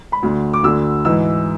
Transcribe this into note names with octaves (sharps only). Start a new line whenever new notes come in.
B5
D2 D3
D6
D2 D3 E6
G#2 E3 E6